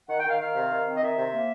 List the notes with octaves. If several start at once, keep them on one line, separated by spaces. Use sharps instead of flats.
D#3 F#5
G5
D#3 F5
D#3 F5
C3
D#3
C4
D#5
D#3 E5
C3
A#3